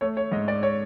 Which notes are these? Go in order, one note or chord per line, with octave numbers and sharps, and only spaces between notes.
A3 C#5
C#5
G#2 D#5
D5
C#5